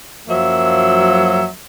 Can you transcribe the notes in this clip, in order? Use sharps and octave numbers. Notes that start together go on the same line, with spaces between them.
F#2 F3 F#3 A#3 E5